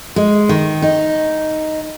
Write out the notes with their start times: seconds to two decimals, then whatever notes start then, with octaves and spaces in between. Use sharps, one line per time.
0.16 G#3
0.49 D#3
0.82 D#4